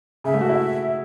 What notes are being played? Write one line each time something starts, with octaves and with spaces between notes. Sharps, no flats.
C#3 E5
A3
F#4
E4